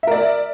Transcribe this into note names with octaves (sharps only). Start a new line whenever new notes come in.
A#4 D5 E5